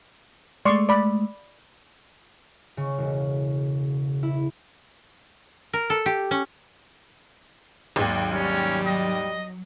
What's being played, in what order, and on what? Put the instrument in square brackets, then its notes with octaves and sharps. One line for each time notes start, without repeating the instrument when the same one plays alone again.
[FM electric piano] G#3 A3 [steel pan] D5 C6 C#6
[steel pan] D5 B5
[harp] C#3
E1
E4
[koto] A#4
A4
G4
C#4
[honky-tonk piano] G#1 D#2 [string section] F#3
[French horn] G3 [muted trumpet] C#4
[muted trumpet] D#5